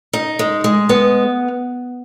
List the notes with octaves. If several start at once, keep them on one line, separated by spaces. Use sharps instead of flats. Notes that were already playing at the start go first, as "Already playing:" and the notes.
D#4
G#3
G#3
B3